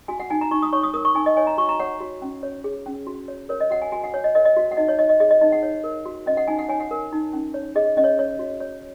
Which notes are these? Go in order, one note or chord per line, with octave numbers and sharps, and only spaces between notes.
F#4 G#5
F#5
D#4 G#5
A#5
D#4 C#6
D#6
C#5 C#6
D#6
A#4 D#6
C#6
D#4 G#5
D#5
C#5 G#5
A#5
F#4 C#6
A#5
C#5 F#5
F#4
C#4
C#5
G#4
C#4
F#4
C#5
A#4 C#5
D#5
F#4 F#5
G#5
F#4 G#5
F#5
C#5
D#5
A#4 D#5
D#5
F#4
F#5
D#4 D#5
C#5
C#5 D#5
D#5
G#4 D#5
D#5
D#4 D#5
F#5
C#5
A#4
F#4
C#4 D#5
F#5
D#4 G#5
F#5
C#5 G#5
F#5
A#4
D#4
C#4
C#5
G#4 D#5
C#4 D#5
C#5
C#5
F#4
C#5